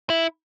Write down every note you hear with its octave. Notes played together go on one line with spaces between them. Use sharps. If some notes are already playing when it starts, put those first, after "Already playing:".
E4